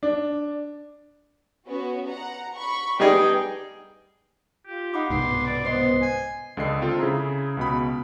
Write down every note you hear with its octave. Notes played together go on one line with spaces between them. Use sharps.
D4
B3 C#4 F#4
F#5 A#5
B5 C#6
G3 B3 D4 D#4 G#4 G5
F4 G4
D#4 F#5 B5 D6
C2 G#2 B2 B3 C6
D5
B3 C5 D#5 C6
G#5
C#2 D3 A4 D#5 C7
C4 F4 A4
C#3 E4 G#4 A#5
C#2 B2 B5